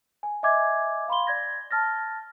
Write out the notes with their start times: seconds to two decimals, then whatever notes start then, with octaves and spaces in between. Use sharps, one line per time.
0.23 G#5
0.43 D#5 E5 G#5 D6 G#6
1.08 F5 B5 C6 G7
1.27 D5 G#6 A#6
1.71 A5 F6 A6 A#6